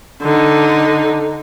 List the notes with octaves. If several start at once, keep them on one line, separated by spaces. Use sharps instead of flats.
D3 D#4